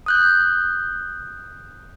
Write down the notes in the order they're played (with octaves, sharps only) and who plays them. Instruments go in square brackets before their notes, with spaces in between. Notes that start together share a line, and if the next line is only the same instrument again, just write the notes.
[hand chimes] D#6 F#6 G6